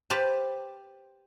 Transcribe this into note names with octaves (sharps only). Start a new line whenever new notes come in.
G4 B4 C5 F5 A5